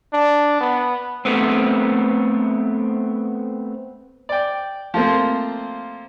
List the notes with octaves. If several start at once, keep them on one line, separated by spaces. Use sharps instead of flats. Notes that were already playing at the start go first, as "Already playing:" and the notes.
D4
B3
A3 B3 C4
D5 G5
F3 A3 A#3 C4